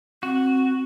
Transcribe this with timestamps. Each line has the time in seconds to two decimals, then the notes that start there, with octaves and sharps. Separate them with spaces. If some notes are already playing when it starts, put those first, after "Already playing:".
0.23 C4 F#4